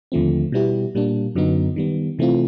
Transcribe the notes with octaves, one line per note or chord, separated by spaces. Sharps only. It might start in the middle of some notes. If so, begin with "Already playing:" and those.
D#2 D3 F3 A3 C4
B2 G3 B3 E4 G4
A#2 G3 A#3 D4
F#2 D3 F#3 B3 D#4
D#3 G3 B3
C3 E3 A3 C4 F4